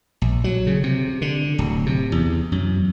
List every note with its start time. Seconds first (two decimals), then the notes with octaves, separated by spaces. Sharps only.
0.22 A#1
0.44 F#3
0.67 C#3
0.83 C3
1.22 D3
1.59 D1
1.86 C3
2.12 E2
2.52 F#2